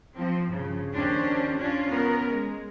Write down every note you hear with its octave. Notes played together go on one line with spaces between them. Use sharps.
F3 C4
G2 C#3 F3
D#2 C#4 D4 G4 C5
C#4 D4 F4
B3 C#4 A#4
G#3